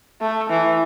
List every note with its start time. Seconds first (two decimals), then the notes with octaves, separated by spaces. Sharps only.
0.21 A3
0.50 E3